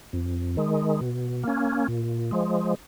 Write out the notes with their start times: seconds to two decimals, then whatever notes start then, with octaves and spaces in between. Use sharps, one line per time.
0.13 F2
0.57 D#3 G#3
1.01 B2
1.43 A#3 C#4
1.88 A#2
2.31 F3 G#3